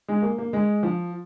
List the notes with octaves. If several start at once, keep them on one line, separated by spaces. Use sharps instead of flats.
G#3
A#3
A#3
G#3
F3